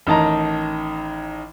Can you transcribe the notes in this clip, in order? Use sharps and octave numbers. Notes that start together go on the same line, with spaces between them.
A1 D#3 D#5 A5 A#5